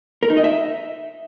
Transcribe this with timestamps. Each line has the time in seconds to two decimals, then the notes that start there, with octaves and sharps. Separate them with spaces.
0.23 A#4
0.30 D#4
0.37 D#5
0.44 E5